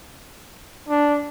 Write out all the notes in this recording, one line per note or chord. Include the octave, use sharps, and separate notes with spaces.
D4